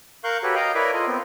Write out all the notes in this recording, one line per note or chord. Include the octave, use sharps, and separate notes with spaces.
A#4 F5 C#6 F#6 G6
F#4 G4 A4 B4 C#5
D#5 F5 G5 A#5
E4 A#4 B4 C#5 D5 E5
F4 A4 D#5
B3 C4